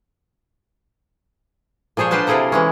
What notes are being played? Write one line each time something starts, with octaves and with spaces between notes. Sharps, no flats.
A#2 F3 G#4 C5 C#5
D4 F4 B4 C5 F#5 A5
C3 E4 F4 G#4 A4 A#5
E3 G#3 C#4